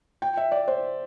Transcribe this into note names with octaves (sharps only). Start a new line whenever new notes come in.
G5
E5
D5
C5